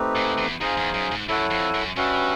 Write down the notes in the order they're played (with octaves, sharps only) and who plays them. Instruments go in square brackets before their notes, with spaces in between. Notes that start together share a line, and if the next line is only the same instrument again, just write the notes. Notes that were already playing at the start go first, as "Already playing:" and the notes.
Already playing: [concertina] A3 C4 D#4 G4 B4
[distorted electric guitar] G#2
E2
[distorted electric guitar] F2 [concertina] D#4 G#4 C5 F5 G#5
[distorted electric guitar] E2
F#2
G#2
[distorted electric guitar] F#2 [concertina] E4 A4 C#5 F#5
[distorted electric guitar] F2
F#2
[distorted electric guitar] G2 [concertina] C#4 F#4 B4 E5